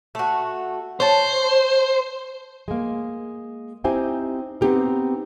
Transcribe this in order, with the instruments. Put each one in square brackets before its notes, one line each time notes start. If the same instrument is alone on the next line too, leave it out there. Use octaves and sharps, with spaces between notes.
[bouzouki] A3 F#4
[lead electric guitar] C5 [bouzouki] C#5 A5
[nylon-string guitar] G#3 A#3
C4 D#4 E4 G4 C5 G#5
B3 C4 D#4 G4 A#4